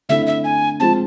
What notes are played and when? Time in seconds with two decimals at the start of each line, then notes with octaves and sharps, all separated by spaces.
0.09 D3 A3 C4 E4 E5
0.27 E5
0.44 G#5
0.80 F3 G#3 C4 A5